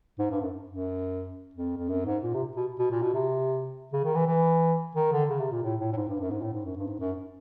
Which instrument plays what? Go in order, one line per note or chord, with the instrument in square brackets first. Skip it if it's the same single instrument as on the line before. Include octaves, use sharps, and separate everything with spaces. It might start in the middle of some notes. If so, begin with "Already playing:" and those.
[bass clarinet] G#2
G2
F#2
F#2
F2
F2
F#2
G#2
A#2
C3
B2
B2
A#2
B2
C3
C#3
D#3
E3
E3
D#3
D3
C#3
C3
A#2
A2
A2
A2
G#2
G2
F#2
G#2
A2
G#2
F#2
G2
G#2
F#2